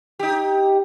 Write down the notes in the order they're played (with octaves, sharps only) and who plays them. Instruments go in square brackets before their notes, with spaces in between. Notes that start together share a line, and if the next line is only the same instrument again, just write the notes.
[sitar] D#4 G4